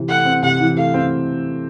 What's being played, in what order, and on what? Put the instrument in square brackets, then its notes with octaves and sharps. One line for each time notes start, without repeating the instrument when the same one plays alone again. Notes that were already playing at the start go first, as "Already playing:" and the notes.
Already playing: [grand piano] C3 E3
[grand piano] A3 [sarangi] F#5
[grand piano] C4
[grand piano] C3 [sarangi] F#5
[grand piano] E3
[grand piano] A3 [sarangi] F5
[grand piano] C4